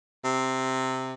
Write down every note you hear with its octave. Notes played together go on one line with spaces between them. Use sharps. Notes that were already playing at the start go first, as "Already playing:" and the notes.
C3